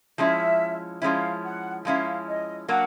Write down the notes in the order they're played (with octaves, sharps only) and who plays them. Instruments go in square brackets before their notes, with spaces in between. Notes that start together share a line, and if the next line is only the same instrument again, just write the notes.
[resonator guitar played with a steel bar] F3 G#3 C#4 E4 [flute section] E5
[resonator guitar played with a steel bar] F3 G#3 C#4 E4 [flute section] F5
[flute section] F#5
[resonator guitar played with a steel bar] F3 G#3 C#4 E4 [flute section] F5
[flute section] D#5
[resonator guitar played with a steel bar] F#3 A#3 D4 [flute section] F#5